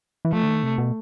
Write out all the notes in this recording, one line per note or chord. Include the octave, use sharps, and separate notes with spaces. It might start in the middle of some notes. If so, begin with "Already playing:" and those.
E3
F3 A3
D3
D#3
C3
B2